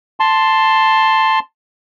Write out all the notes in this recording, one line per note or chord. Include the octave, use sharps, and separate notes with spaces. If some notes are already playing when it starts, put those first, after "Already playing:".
A5 C6